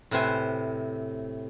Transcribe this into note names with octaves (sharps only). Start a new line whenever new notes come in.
A2 C3 B4 C5 G#5